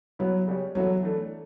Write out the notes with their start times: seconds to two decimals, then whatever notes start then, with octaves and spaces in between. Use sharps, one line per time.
0.19 F#3 B3 E4 B4
0.47 C#3 G3 C#4 G4 C#5
0.75 E3 F#3 B3 F#4 A4 E5
1.03 E3 A3 D4 A4